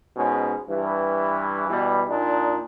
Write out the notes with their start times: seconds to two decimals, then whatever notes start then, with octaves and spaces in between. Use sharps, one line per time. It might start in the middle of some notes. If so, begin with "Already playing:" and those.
0.16 G#2 B2 C#4
0.69 G2 E3
1.69 B2 E3 G3
2.09 A#2 D4 D#4